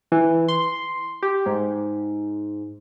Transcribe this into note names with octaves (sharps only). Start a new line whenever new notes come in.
E3
C6
G4
G#2